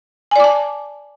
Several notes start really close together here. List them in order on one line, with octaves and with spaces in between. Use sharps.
G#5 D5 D6 A5